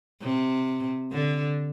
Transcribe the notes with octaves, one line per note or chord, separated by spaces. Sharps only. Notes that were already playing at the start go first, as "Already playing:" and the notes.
C3
D3